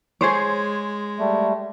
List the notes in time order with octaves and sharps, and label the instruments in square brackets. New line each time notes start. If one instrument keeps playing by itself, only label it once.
[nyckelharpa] G#3 [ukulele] G#4 C5 C#5
[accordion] G3 A3